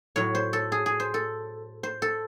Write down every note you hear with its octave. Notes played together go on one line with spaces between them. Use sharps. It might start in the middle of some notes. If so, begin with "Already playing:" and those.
A2 F#3 C#5
C5
A4
G#4
G#4
C5
A4
C5
A4